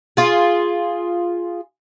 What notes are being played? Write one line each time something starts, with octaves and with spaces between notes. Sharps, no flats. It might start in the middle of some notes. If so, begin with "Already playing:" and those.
F4 G#4